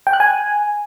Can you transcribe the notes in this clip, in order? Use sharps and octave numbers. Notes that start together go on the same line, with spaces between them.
G5
F#6
G#5